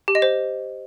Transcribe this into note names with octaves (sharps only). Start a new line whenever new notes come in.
G4
D#5
C5